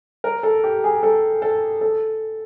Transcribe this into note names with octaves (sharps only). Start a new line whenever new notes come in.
A#4
A4
G4
G#4
A4
A4
A4